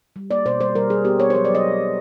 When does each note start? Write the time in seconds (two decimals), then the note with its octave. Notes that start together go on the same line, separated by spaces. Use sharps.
0.16 G3
0.31 A#3 D5
0.46 B2 C5
0.60 G3 C5
0.75 G3 A#4
0.90 G3 G#4
1.05 B3 G4
1.20 B3 C#5
1.30 C5
1.35 F#3 C#5
1.45 D5
1.50 F#3
1.55 D#5
1.65 F#3
1.80 F#3